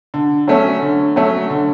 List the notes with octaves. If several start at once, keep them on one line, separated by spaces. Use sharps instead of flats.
D3
F#3 A3 C#4
D3
F#3 A3 C#4
D3